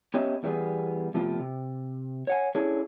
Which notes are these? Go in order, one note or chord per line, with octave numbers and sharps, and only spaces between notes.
B3 C#4 G4 C#5 D#5 E5
E2 D#3 G3 B3 G#4 G#5
C3 F3 A3 B3 F4 G4
C3
C#5 F#5 G#5
C#4 D4 E4 G#4 A4 C#5